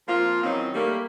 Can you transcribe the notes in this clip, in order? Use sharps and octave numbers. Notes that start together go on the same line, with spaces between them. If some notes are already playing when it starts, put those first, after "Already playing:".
F3 A#3 C4 F4
D#3 E3 F#3 C4 C#4 D#4
G3 A3 A#3